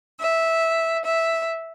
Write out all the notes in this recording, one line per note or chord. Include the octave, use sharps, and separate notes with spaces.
E5
E5